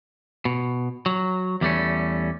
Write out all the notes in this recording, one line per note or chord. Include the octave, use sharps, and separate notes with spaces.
B2
F#3
E2 G3 A3 C#4